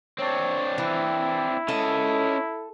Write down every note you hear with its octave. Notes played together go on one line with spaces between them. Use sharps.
C4 D4 C#5
E3 E4
C#4 A4 D#5